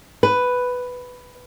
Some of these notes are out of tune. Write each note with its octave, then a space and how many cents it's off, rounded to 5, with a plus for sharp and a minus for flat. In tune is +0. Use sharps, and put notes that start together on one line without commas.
B4 +5